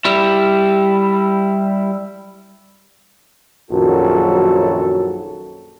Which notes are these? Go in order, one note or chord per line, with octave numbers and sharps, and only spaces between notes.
G3 E4
A#1 F#2 D#3 F#3 F#4 A4